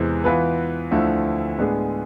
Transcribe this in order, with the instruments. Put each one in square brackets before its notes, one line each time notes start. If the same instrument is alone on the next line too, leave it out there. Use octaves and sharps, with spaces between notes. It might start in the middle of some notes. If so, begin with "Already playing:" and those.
Already playing: [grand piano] E2 C3 G#3 B3 E4
E3 B3 F4 B4
D2 D3 F3 A3 E4
A2 G#3 B3 D4 G#4